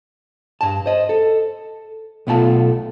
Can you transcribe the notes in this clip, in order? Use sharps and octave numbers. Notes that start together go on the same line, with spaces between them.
G2 A5
C5 D#5
A4
B1 B2 A3 E4 F4 A5